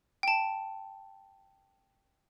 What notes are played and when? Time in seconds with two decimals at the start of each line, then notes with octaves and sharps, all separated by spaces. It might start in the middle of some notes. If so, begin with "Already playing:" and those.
0.23 G5 A5